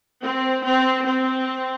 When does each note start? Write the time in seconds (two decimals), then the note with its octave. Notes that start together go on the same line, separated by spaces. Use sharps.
0.22 C4
0.65 C4
1.07 C4